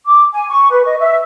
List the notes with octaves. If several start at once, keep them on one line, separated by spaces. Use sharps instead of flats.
D6
G#5
C#6
B4
D#5
E5